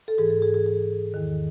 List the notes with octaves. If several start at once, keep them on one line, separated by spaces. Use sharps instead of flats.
A4
G#2 E3 G#4
A4
G#4
G#4
G#4
E2 D#3